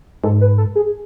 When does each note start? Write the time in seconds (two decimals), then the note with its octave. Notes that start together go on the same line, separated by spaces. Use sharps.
0.24 G#2 A4
0.41 B4
0.58 A4
0.75 G#4